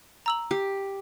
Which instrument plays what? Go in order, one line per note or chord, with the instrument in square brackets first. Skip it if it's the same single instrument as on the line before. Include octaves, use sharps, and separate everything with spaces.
[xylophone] A#5 E6 F#7
[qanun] G4